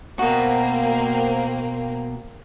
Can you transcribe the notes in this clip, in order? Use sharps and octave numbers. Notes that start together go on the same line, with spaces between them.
B2 A#3 C4 F#4